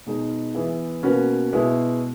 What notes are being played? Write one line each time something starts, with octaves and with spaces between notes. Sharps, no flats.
B2 G#3 D#4 G#4
E3 B3 E4 G#4
B2 A#3 C#4 F#4 B4
B2 G#3 B3 E4 G#4